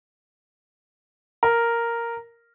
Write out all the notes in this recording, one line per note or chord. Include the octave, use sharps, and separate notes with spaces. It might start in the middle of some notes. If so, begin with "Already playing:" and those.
A#4